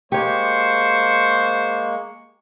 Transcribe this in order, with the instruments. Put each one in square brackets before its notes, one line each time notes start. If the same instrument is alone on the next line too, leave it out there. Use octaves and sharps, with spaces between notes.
[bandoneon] G#3 A#3 [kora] G4 C#5 [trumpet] C5 [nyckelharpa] C#6